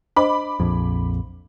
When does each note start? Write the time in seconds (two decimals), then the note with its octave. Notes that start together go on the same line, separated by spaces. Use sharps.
0.16 D4 C5 D#5 B5 D6
0.60 A#1 F2